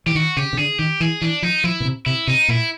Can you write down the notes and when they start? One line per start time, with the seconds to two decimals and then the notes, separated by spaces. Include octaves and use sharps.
0.06 E3 G4
0.15 D#3 F#4
0.37 C#3 G4
0.53 C#3
0.57 D3 G#4
0.78 D#3 G4
1.00 E3 G#4
1.21 E3 D4
1.42 F3 D#4
1.64 F3 E4
1.80 B2
1.85 C3
2.06 C3 E4
2.27 C3 D#4
2.48 A#2 E4